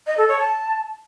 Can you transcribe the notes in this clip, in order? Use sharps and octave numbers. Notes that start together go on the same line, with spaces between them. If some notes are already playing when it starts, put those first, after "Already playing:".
D#5
A4
C#5
A5